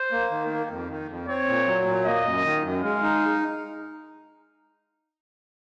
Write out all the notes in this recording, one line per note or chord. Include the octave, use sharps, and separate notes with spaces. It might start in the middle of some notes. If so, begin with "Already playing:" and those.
Already playing: C5
A#3
D#3
A#3
F2
D#3
F2
C4 C#5
A#2
F#3
A#2
A#3 D#5
F#2
D#3
F#2
G#3 F5
D#4